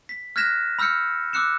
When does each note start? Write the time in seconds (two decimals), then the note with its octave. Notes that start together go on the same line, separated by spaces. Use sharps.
0.09 B6
0.36 F6 F#6 G#6 A#6 B6 E7
0.79 B5 E6 F6 G6 C#7
1.33 D6 E6 F#6 C#7 E7